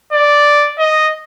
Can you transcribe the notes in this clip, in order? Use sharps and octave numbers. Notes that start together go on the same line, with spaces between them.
D5
D#5